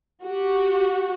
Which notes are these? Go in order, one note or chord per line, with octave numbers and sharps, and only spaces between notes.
F#4 G4